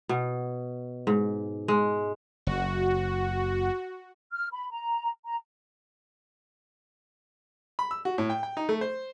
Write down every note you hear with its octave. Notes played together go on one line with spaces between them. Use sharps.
B2
G#2
G#3
F#1 F#4
F6
B5
A#5
A#5
B5
E6
F#4
A2
G5
G5
D#4
A3
C5